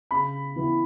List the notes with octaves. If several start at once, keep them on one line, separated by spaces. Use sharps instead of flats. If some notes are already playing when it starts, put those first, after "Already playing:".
C#3 B5
E3 B3 E4